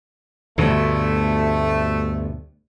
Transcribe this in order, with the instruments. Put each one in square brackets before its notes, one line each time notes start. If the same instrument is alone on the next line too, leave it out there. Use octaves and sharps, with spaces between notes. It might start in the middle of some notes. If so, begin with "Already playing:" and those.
[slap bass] D2 G2 B2 [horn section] A3